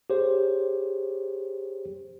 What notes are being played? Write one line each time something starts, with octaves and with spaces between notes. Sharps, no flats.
G4 G#4 C5 C#5